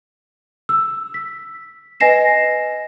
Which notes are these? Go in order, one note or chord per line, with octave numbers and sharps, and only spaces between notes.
E6
B6
B4 D#5 G#5 A#6 C7 E7